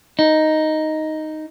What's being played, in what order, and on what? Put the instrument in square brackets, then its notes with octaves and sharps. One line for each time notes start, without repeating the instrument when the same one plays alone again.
[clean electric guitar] D#4